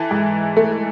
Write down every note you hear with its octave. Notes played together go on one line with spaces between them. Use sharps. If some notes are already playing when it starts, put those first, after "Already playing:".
Already playing: E3 A4
G#2
A3